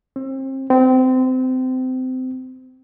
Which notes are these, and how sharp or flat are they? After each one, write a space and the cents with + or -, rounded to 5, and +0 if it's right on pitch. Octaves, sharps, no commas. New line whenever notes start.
C4 +35
C4 -25